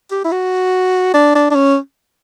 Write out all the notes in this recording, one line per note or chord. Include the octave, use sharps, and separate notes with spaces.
G4
E4
F#4
D4
D4
D4
C#4